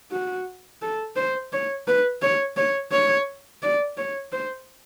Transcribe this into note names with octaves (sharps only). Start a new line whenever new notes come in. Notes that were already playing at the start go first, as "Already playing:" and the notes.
F#4
A4
C5
C#5
B4
C#5
C#5
C#5
D5
C#5
C5